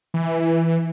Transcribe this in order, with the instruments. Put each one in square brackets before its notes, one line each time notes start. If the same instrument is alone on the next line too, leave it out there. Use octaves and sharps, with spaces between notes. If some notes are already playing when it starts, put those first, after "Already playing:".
[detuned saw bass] E3